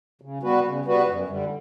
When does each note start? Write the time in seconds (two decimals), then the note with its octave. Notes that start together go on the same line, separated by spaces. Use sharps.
0.22 C#3
0.43 G3 B3 F#4 B4
0.63 C#3
0.85 G3 B3 F#4 B4
1.07 F#2
1.28 D3 G3